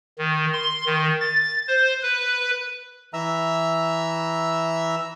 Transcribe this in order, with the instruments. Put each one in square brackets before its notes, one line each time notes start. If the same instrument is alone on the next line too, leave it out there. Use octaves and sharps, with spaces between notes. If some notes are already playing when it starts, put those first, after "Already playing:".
[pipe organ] D#3
C6
D#3
A6
C5
B4
[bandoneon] E3 E5 A#5 E6